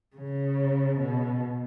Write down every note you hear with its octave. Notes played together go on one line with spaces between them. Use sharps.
C#3
B2